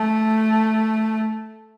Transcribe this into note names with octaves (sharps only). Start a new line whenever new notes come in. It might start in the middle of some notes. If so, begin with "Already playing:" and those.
Already playing: A3